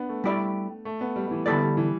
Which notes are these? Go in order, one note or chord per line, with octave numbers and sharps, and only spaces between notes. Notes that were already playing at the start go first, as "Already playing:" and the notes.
Already playing: B3 D4
A3
G3 E4 G4 D5
A3
B3
G3
G3
E3
D3 G3 B3 E4 A4 D5
G3
E3